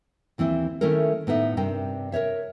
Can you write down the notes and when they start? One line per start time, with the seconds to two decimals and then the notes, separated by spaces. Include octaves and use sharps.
0.38 D#2 E3 C4 E4
0.81 D#3 A3 C#4 E4 A4 A#4
1.27 A2 B3 D#4 E5
1.57 G2 C3 D4 A#4 G5
2.12 A#4 C5 C#5 E5